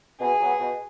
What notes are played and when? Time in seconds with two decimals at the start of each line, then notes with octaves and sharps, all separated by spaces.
0.20 B2 G#4
0.40 F#3 B3
0.59 B2